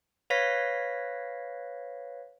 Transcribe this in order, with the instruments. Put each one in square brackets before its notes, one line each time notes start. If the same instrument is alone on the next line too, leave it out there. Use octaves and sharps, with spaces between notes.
[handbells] B4 C#5 F5 A#6 B6